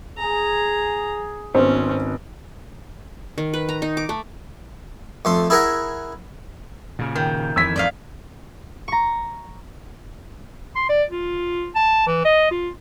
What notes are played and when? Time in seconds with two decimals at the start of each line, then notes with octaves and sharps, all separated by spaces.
0.18 G#4 A#5
1.55 G#1 B3 C#4 C5
3.38 D#3
3.53 B4
3.69 A#5
3.82 D#4
3.97 D6
4.09 A3
5.25 F2 A3 C6
5.50 E4 G#4 A#4 E5 F#5 A#5
6.99 A#2 C#3
7.15 D#3 G6
7.56 F2 E3 E6 G#6 B6
7.76 F2 A2 D#3 D5 D#5 F5
8.88 A#5 C#6
10.76 C6
10.89 D5
11.11 F4
11.76 A5
12.07 E3
12.25 D#5
12.51 F4